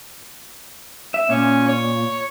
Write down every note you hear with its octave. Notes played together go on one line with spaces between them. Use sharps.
E5
A#2 C#4
C#5